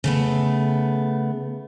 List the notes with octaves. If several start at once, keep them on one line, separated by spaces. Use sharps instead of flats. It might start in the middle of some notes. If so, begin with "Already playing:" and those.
C#3 A3 B3